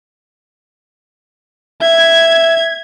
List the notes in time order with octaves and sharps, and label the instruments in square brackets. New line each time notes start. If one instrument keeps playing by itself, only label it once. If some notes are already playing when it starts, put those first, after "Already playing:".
[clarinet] E5 [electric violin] G#6